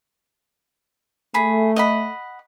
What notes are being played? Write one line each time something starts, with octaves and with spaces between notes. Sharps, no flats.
A3 G#4 B5
D#5 F#5 B5